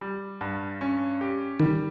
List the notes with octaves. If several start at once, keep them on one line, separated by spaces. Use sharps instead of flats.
G3
G2
C#4
G4
D#3 G3